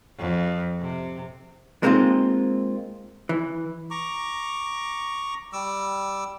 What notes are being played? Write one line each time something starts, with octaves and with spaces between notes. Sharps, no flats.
F2
C3
G#3 A#3 C4 D#4 F4
E3
A#5 C#6 D6
G3 D6 E6